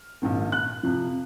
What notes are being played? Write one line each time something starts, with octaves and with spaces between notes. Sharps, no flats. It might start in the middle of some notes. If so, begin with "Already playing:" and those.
Already playing: F6
A#1 G#2 D#3
F#6
F2 C3 F3